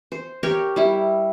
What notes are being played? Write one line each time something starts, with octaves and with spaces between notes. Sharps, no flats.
C5
G4 A#4 C#5 G5
G3 E4